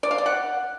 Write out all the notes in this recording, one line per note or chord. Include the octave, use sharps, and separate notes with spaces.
D5
F5
D5
F#5